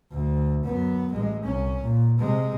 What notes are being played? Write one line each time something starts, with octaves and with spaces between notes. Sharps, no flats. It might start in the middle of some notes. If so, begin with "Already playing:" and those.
D2
F#2 B3
A1 G#3
C2 C#4
A#2
C3 G#3